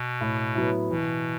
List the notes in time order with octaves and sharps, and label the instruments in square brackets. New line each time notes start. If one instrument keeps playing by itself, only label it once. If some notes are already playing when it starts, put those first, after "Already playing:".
Already playing: [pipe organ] B2
[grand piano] A2
F#3 B3 E4
[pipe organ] B2 [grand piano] E3